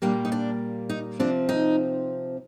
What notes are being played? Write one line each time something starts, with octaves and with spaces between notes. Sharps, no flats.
A#2 G3 A#3 D4
D#4
D4
D#4
C3 F3 C4 D4
D#4